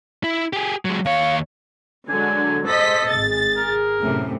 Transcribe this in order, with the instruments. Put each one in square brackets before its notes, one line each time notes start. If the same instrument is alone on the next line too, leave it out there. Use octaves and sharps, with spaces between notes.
[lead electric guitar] E4
G4 G#4
F#3 G#3
[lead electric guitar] D#2 C#5 [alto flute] F5
[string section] D3 F#3 G#3 [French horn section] D4 [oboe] G#5
[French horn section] G#3 [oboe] A4 [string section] C5 D#5 B6
[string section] G#1 A6 [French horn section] G#4
[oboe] A#4
[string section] F#2 A2 C3